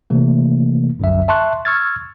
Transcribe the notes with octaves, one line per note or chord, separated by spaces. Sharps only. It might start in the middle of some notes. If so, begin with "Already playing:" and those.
C3 E3 A3 A#3
G1 C2 F#2 F#3 E5
E5 A5 C6 C#6 F#6
C#6 E6 F6 G#6 A6